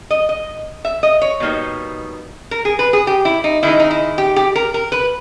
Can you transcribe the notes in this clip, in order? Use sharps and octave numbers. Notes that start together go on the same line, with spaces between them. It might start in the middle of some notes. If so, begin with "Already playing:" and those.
D#5
D#5
E5
D#5
C#5
B2 G3 A#3 D#4
A#4
G#4
B4
G#4
G4
E4
D#4
D#3 G#3 D#4 E4
D#4
E4
G4
G4
A#4
A#4
B4